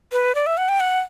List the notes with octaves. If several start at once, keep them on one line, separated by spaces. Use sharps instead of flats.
B4
D5
E5
F#5
G5
F#5